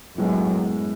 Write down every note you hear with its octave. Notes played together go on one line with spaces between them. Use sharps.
F#2 A2 G#3 B3